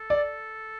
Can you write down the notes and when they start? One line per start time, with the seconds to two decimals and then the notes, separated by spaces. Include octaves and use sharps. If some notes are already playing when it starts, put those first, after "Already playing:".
Already playing: A4
0.10 D5